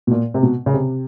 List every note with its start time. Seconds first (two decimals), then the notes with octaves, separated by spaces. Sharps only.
0.07 B2
0.11 A#2
0.34 C3
0.43 B2
0.66 C#3
0.74 C3